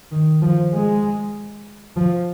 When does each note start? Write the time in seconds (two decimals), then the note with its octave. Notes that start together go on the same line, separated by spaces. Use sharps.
0.12 D#3
0.42 F3
0.73 G#3
1.97 F3